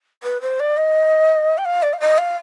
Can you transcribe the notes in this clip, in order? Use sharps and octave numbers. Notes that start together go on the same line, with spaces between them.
B4
C5
D5
D#5
G5
F5
D5
F5
D#5
F5